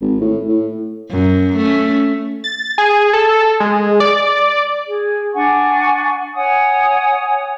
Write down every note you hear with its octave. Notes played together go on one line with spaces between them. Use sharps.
G#1
A2
A2
F#2
A3 C#4
A6
G#4
A4
G#3
D5
G#4
D4 F#5 G#5 C#6
C#5 F#5 G#5 D#6